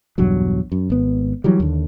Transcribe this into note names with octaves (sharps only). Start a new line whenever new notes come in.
B1 E2 G2 F#3
F#2
G#1 B3
E3 F#3 G3
D#2 D3